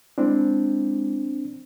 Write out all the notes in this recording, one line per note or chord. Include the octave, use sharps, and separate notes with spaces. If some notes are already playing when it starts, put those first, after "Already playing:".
G#3 C4 D4 E4